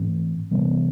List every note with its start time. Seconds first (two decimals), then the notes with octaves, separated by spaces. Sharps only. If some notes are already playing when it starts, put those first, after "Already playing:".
Already playing: G#2 E3 A3 C4
0.51 C3 E3 G3 B3